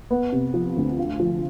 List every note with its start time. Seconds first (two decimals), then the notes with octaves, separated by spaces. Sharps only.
0.11 B3
0.32 C3
0.54 F3
0.77 D2
0.98 F4
1.19 F3